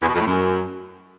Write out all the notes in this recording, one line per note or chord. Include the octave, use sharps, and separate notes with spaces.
E2
B2
F2
A2
F#2